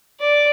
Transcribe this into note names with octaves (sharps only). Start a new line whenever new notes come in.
D5